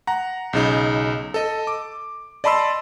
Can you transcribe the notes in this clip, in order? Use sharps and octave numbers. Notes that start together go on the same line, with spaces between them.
F#5 A#5
B1 C#3 D#4
A4 D#5
D6
D5 D#5 A5 B5 C6 E6